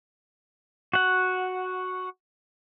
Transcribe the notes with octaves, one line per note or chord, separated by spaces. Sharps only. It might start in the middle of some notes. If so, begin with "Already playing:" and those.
F#4 F#5